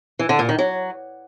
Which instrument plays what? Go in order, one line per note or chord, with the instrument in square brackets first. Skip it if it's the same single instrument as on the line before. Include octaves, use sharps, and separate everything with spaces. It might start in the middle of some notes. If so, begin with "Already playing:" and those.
[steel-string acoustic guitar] E3
D3
A#2
D#3
F#3